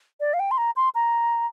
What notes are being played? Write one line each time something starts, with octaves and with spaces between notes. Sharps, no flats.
D5
F5
G5
C6
A#5
C6
A#5